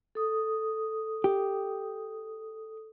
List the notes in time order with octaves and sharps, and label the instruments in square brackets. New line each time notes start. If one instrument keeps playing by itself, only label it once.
[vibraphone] A4 D#6
[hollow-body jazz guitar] G4